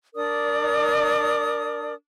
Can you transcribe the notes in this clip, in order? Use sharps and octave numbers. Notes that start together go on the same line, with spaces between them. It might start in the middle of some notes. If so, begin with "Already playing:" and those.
D4 A#4 D5 D#6